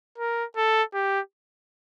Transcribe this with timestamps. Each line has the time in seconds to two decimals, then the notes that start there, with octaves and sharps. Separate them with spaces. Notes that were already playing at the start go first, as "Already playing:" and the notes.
0.18 A#4
0.57 A4
0.94 G4